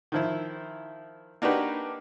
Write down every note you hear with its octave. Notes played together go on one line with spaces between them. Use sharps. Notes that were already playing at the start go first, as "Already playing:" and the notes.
D#3 F3 E4
A#3 D4 D#4 F#4 G4 B4